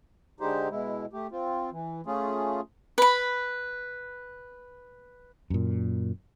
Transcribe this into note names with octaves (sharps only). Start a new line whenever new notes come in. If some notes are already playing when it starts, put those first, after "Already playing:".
D3 G#3 D#4 G4 C5
B2 G#3 E4
A3 G4
C4 F4
E3
A3 C#4 F4 G#4
B4 B5
F#2 A#2